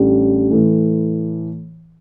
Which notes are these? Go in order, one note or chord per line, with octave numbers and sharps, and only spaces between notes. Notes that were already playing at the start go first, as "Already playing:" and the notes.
Already playing: A1 A2 G3 D4 G4
A2 E3 A3